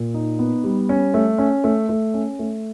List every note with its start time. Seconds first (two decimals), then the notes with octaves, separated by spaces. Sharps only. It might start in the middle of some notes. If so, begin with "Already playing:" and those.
Already playing: A#2
0.14 D#4
0.39 B3
0.64 G3
0.89 C#4
1.14 A3
1.38 C#4
1.64 A3
1.89 A3
2.14 C#4
2.39 A3